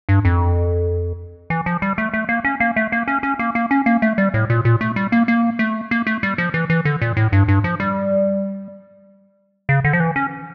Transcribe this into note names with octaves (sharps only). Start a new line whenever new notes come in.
G2
F2
E3
F3
G3
A3
A3
A#3
C#4
A#3
A3
A#3
C#4
C#4
A#3
A#3
C#4
A#3
A3
G3
A2
A#2
A#2
A3
G3
A#3
A#3
A3
A#3
A3
G3
F3
E3
E3
D3
A#2
A2
G2
G2
F3
G3
C#3
D3
F3
E3
C#4